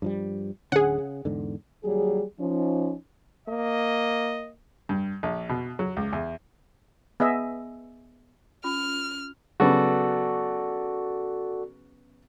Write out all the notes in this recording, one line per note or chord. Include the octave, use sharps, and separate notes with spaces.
G2 F3 G3
D1 D3 C#4 G#4 F#5
C#3
E2 G#2 D3
D#2 F#3 G3 G#4
F3 C#4 D#4
A#3 D#5
G2
A#1
B2
F#3
C#2
E2
B3 G#4 D#5 E5
C#4 F4 D6 F6
C#3 F#3 B3 F#4 A4 D5